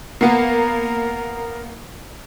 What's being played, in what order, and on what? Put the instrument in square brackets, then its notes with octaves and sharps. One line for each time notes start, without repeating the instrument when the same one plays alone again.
[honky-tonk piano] A#3 B3 [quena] A#4